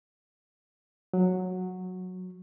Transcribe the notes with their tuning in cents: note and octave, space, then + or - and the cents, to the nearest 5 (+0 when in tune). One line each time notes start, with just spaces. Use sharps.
F#3 -10